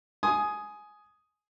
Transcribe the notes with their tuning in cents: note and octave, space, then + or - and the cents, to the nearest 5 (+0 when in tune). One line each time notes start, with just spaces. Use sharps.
G#5 +15 C6 +0 D#6 +0